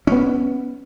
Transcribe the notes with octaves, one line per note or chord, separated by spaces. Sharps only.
B3 C#4